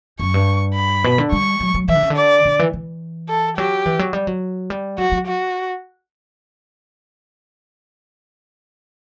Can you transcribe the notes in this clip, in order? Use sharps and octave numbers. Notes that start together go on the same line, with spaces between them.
F#2 C#6
G2
B5
B2
D3
G3 C#6
F#3
F#3
E3 E5
D3
C#3
D3
D5
D3
E3
E3
A4
F#3 G4
E3
F#3
G3
F#3
G3
F#3 F#4
F#3
F#4